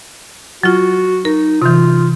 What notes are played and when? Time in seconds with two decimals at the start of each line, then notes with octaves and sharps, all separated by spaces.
0.63 F#3 F4 F#4
1.25 D#4 A#4
1.62 C3 E3 F4